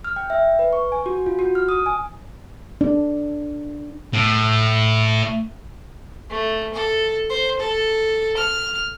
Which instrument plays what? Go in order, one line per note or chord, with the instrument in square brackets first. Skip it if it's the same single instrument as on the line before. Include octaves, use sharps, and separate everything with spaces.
[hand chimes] F6
G5
E5
B4
C#6
G#5
F#4
F4
F#4
F6
D#6
G#5
[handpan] D4
[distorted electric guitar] A2
[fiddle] A3
A4
C5
A4
F6